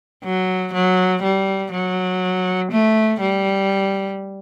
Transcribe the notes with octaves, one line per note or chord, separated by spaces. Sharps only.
F#3
F#3
G3
F#3
A3
G3